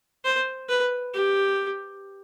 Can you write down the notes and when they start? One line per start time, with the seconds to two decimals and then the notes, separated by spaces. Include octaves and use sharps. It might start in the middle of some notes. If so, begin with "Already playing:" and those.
0.24 C5
0.69 B4
1.14 G4